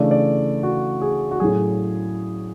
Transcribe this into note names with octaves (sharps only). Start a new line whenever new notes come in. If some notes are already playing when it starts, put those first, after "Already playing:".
Already playing: C#3 E3 A3 D4 D5
D5
F#4
G#4
F#4
A2 F#3 C#4 G#4